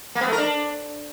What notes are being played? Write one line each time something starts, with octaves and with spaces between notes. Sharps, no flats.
A#3
B3
A3
A#4
D4